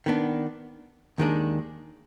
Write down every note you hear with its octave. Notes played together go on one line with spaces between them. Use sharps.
D#3 B3 D4
D#2 D#3 G#3 D4